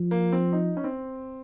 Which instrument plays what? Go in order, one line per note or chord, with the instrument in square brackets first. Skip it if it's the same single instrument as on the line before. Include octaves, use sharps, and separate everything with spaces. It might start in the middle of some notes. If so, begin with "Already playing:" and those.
Already playing: [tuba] F3
[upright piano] A#3
C4
D#4
C#4
C4